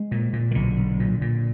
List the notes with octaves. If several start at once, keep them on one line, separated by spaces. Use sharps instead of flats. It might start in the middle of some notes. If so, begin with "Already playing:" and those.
Already playing: G#3
A#2
A#2
D#3
B1 D3
B1
A#2
A#2